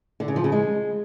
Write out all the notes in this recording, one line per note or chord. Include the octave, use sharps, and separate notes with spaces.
D3
C#3
F3
C#3
G#3